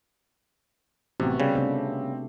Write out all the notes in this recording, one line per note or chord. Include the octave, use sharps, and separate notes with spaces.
A1 C3 B3 F#4
C#3 G3
C3 A3 C4 D4